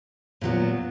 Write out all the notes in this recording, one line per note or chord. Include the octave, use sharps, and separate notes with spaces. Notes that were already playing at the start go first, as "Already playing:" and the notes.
A#2 F#3 B3